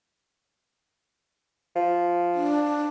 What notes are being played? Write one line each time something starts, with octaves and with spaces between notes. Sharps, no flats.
F3
D4